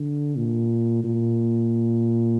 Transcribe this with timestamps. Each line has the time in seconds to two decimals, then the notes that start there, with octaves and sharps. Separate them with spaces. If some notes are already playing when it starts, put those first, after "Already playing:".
Already playing: D3
0.37 A#2
1.04 A#2